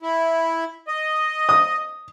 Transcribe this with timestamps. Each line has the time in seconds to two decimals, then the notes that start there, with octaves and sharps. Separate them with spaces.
0.03 E4
0.88 D#5
1.49 D#6